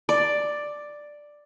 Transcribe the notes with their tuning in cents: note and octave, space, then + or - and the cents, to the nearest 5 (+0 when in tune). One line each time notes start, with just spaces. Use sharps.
D5 +5